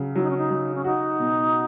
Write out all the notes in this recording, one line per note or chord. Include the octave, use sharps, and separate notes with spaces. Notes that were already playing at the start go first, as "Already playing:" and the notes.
Already playing: C#3 F#3
F#3 E4
D#4
C#4
D#4
F#3
C#4
D#4 F#4
B2